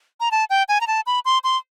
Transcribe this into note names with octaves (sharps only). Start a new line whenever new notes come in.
A#5
A5
G5
G#5
A#5
A5
B5
C6
C6